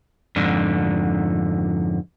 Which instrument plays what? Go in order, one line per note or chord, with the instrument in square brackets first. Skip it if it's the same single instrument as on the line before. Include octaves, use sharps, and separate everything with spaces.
[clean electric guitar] F2 G#2 D3